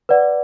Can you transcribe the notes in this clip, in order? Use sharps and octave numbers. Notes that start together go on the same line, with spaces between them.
B4 D5 F#5